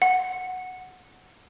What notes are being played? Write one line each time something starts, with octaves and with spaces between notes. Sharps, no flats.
F#5